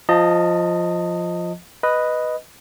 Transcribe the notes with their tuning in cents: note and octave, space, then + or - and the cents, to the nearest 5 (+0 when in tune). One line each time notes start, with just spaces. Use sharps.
F3 +0 D#5 +0 A5 +35
B4 +0 D#5 +0